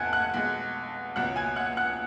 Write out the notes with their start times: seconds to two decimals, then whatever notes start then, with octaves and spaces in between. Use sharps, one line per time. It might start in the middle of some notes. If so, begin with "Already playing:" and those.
Already playing: F1 F2 F3 B3 F#5 G#5 F#6 G#6
0.13 F#5 F#6
0.34 B1 B2 G#3
1.16 C#2 B2 F#3 F#5 F#6
1.36 G#5 G#6
1.56 F#5 F#6
1.77 F#5 F#6